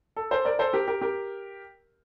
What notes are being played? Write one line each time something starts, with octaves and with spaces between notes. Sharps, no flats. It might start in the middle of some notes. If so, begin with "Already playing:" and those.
A4
A4 C5
A#4 D5
A4 C5
G4 A#4
G4 A#4
G4 A#4